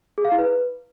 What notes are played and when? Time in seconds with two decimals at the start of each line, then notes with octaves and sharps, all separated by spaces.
0.18 G#4
0.25 F5
0.32 E4
0.39 B4